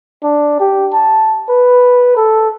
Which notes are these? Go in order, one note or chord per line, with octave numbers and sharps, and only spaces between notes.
D4
G4
A5
B4
A4